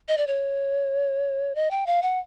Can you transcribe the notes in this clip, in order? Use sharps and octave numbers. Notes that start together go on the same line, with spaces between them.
D#5
D5
C#5
D#5
G5
F5
F#5